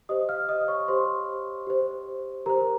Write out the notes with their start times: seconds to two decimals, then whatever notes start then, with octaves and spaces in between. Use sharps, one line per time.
0.09 G4 C5 D#5 D#6
0.29 F5 F6
0.49 D#5 D#6
0.68 C#5 C#6
0.88 G4 C5 C6
1.67 G4 C5
2.46 G4 A#4 C5 A#5